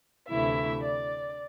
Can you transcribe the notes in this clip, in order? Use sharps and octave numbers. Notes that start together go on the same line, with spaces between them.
D2 C3 E3 A3 E4 E5
D5